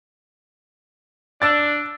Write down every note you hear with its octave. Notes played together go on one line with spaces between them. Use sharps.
D4 E6 A6